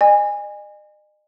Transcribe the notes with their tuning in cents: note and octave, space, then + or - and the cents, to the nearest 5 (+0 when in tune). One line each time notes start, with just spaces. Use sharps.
D#5 -40 G#5 -20